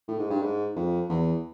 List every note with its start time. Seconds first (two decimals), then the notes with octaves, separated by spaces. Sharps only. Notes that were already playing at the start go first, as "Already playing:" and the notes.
0.08 A2
0.19 G#2
0.30 G2
0.42 G#2
0.76 F2
1.09 E2